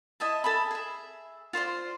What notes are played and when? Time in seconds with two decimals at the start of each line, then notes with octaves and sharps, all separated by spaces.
0.20 E4 D#5 E5 A5
0.44 A4 E5 G#5 B5
0.71 G#4 E5
1.53 F4 C5 D5 C6